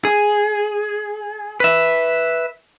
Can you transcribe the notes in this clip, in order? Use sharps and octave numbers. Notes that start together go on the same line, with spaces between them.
G#4
B4 E5